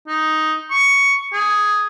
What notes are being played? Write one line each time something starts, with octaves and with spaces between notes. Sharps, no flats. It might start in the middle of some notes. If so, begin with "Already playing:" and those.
D#4
C#6
G#4